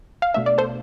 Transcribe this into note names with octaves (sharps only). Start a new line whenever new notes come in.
F5
B2 A3 D4 E5
D5
A4 C5